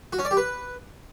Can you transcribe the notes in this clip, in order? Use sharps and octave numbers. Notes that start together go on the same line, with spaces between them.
F#4
C#4
D5
G4
B4